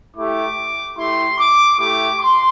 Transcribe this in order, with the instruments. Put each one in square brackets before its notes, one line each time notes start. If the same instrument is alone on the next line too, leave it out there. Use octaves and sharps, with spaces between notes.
[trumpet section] A3 E4 G4 D6
A3 E4 G4 C6
D6
A3 E4 G4 D6
C6